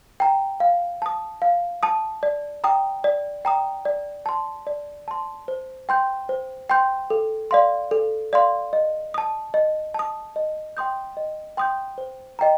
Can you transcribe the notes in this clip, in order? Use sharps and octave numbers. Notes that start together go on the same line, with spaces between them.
G5 A#5
F5
A5 D#6
F5
A5 D#6
D5
G5 A#5 D#6
D5
G5 A#5 D#6
D5
A5 C6
D5
A5 C6
C5
G5 C6 G6
C5
G5 C6 G6
A4
D5 F5 C6
A4
D5 F5 C6
D#5
A5 D#6
D#5
A5 D#6
D#5
G5 C6 D#6 G6
D#5
G5 C6 D#6 G6
C5
D#5 G5 A#5